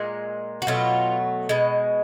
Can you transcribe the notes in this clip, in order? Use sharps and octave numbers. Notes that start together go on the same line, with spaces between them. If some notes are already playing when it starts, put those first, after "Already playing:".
Already playing: A#2 G#3
F#4
B2 F#3 A3 F4
B2 G#3